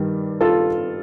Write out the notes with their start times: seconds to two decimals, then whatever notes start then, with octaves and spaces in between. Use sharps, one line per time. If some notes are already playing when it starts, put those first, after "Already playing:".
Already playing: G2 D#3 G3
0.41 F4 A4